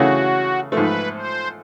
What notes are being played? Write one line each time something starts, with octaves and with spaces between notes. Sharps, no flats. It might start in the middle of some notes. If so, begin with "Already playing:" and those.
Already playing: C#3 E3 A3 C#4 F#4
G#2 F3 A3 B4
C5